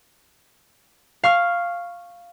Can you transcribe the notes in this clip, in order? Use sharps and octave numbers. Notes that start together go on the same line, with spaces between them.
F5 C#6 F6